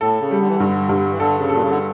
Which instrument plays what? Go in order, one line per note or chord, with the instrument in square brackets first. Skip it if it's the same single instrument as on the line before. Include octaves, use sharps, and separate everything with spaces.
[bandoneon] A2 [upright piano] A4
[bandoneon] C#3
[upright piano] G3
[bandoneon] D3
E3
[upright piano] G2 [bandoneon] D3
[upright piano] G2
[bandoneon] E3
[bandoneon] D3 [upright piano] A4
[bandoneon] C#3
[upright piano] A4
[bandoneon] A#2
C#3
D3